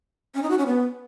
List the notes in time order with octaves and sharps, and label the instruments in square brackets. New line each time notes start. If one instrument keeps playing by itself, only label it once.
[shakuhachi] C#4
D#4
F#4
C#4
B3